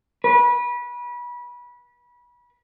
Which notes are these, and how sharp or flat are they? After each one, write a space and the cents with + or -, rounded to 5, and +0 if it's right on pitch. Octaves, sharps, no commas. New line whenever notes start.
B4 -25